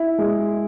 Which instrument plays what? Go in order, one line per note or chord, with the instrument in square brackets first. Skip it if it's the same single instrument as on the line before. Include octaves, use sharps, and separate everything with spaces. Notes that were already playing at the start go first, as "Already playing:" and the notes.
Already playing: [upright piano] E4
G#3